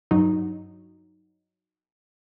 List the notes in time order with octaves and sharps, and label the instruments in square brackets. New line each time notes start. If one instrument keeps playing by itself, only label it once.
[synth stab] G2 F#3 D#4